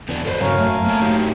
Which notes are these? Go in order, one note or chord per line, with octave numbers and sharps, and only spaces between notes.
E2 B3 D4
B2 A4 B4 C5
G2 C#3 F#3 A#4 C#5 F5 G#5
F#2 A3
A#3 C#5 A5
F#3 D#4 G4